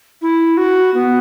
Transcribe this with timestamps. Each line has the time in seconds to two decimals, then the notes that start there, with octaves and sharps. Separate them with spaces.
0.22 E4
0.57 F#4
0.94 B3